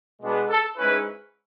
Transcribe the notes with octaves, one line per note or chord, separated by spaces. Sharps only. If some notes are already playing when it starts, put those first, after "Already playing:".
B2 G#3 B3 D4
A4
G#2 G#3 C#4 E4 B4